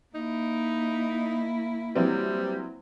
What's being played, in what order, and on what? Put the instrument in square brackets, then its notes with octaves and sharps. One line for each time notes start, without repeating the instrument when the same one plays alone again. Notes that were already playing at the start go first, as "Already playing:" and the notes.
[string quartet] A#3 E4 [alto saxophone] D#4
[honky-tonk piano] E3 F#3 C4 [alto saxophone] G3